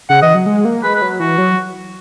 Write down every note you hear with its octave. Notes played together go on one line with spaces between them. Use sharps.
C#3 F#5
E3 D#5
F#3
G#3
A#3
G#3 B4
B4
F#3
E3 F#4
F#3